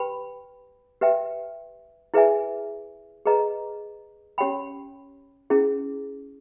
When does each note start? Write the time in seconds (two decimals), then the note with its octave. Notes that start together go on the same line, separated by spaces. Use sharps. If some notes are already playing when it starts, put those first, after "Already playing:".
Already playing: G4 B4 G5 B5
1.01 G4 B4 E5 G5
2.14 E4 G#4 B4 E5 G#5
3.26 G#4 B4 D#5 A#5
4.38 C#4 G4 C#5 G5 B5
5.50 C#4 E4 G#4